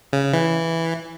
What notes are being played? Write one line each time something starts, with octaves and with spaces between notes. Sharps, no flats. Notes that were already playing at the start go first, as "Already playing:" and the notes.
C#3
E3